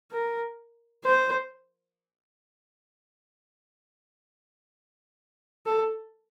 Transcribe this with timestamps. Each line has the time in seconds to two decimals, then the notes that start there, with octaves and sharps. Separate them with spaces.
0.11 A#4
1.04 C5
5.66 A4